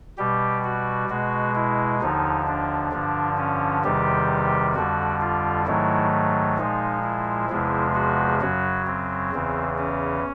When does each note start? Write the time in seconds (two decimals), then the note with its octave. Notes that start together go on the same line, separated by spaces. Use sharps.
0.18 B2 G3 G4
0.64 F#4
1.10 B2 G#3 F#4
1.55 E4
2.01 D#2 D3 F3 D#4
2.47 D4
2.92 G2 D3 F3
3.38 C#4
3.84 E2 C3 D#3 G3 G4
4.75 F2 D3 G3 F#4
5.21 F4
5.66 G#2 D#3 F#3 A3 E4
6.57 A#2 F3 G#3 D#4
7.04 E4
7.49 E2 C3 F3 G#3
7.95 F#4
8.41 F#2 C#3 F#3 F#4
8.87 C4
9.33 E2 C#3 E3
9.78 C#4